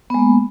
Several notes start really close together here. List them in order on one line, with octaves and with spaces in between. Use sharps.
B3 G#3 A#3